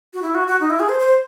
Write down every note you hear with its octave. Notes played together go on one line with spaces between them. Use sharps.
F#4
E4
F#4
F#4
D#4
E4
G#4
C5
C5